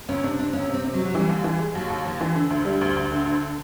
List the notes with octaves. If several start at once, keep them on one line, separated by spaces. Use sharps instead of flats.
C#2 C#4
C3 D4
C3 D4
C#2 C#4
C3 C4
C3
F#3
C3
F#3
E3 G3
D#2
E3
G#3
D#2 F#3
D#2
D#2 F3
E3
D3
D2
G3
D2
D2
D3
D2